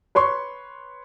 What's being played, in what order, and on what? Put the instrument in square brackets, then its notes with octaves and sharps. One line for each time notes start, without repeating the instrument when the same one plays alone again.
[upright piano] B4 C#5 C6 C#6